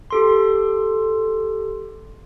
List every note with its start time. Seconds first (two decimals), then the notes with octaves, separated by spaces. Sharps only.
0.11 G4 A4 C6